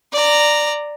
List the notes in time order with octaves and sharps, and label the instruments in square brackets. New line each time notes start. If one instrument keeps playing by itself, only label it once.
[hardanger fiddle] D5 A#5